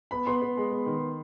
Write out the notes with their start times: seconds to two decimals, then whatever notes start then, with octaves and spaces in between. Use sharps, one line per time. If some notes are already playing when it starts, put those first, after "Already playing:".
0.11 B3 B5
0.27 B3 C6
0.42 B3
0.57 G#3
0.72 B3
0.86 D#3